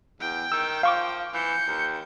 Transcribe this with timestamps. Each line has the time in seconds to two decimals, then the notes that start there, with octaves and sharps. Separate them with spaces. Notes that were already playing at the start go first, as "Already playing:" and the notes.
0.20 E2 G5
0.52 D#3 E6
0.83 F3 F5 C#6 D6
1.34 E3 G6 C#7
1.67 D#2